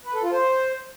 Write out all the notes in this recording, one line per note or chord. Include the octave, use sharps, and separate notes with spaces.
B4
A4
F4
C5